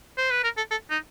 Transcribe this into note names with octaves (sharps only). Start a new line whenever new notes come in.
C5
B4
A#4
A4
A4
D#4